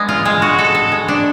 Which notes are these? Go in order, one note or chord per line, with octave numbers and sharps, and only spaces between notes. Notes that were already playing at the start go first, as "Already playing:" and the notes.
Already playing: G#3 B3 D4
F4
G#3
F#4
A4
A4
G#3
D4